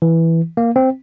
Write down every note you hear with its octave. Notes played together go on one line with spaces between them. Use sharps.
E3
A#3
C4